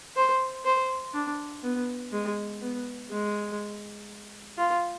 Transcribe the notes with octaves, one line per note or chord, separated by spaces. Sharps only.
C5
C5
D4
B3
G#3
B3
G#3
F4